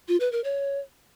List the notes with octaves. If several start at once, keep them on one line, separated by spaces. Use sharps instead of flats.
F4
B4
A#4
C#5